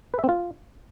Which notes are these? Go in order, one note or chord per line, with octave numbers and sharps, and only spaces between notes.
B4
E5
C4
F4